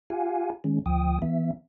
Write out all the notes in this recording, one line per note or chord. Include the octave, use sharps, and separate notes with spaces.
F4 G4 F5 F#5 G#5
D#3 G#3 C#4
D2 F3 G5 D#6
E3 B3 E5